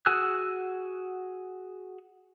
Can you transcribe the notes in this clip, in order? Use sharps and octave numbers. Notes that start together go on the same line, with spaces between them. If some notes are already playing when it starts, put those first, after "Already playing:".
F#4 G#4 G#5 E6 F#6